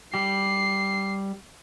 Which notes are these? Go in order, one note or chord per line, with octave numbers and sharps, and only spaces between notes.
G3 G4 C7